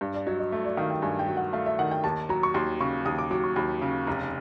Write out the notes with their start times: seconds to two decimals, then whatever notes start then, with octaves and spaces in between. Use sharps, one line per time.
0.01 G2
0.14 D5
0.26 F#3 D#5
0.39 D#5
0.52 A3
0.64 D5
0.77 D#3 F5
0.90 G5
1.02 G2 G#5
1.19 G5
1.28 F#3
1.37 F#5
1.53 A3 F5
1.66 E5
1.79 D#3 F#5
1.91 G5
2.04 D#2 A5
2.29 F#3 A#5
2.43 C#6
2.54 D#2 C6
2.80 C#3 C#6
3.05 D#2 D#6
3.18 D6
3.31 F#3 D6
3.44 C#6
3.56 D#2 B5
3.82 C#3
4.07 F1 A#5